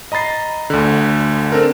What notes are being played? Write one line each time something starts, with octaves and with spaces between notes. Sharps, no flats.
D#5 A#5 B5 A6 C7
D2 D3
C4 D4 A4 A#4